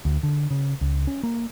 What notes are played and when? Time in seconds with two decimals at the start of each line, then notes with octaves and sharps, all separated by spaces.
0.05 D2
0.23 D3
0.51 C#3
0.81 C#2
1.07 C#4
1.23 A#3